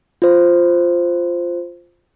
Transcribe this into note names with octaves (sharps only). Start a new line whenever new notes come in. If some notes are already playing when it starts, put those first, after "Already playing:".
F4 C5